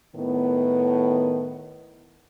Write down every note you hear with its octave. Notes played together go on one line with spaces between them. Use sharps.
A2 D#3 B3